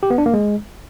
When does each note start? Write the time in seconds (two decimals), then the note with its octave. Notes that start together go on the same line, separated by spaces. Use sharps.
0.03 G4
0.10 B3
0.18 D4
0.26 A#3
0.34 G#3